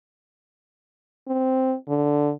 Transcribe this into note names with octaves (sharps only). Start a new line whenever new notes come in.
C4
D3